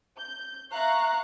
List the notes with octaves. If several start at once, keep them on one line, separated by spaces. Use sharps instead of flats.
G6
E5 F5 A#5 C#6 F#6